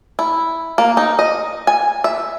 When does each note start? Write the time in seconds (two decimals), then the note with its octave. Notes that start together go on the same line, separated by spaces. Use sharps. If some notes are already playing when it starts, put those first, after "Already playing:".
0.19 E4
0.78 A#3
0.97 D#4
1.19 D#5
1.67 G#5
2.04 E5